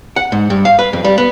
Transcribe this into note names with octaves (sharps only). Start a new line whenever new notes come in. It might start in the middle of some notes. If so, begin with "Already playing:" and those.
F#5
G#2
G2
F5
B4
F2
G3
B3